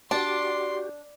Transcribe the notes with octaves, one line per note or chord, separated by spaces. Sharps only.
D4 F#4 G4 D5 C6